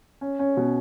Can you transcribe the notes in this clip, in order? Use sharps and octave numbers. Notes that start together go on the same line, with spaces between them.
C#4
C#4
B2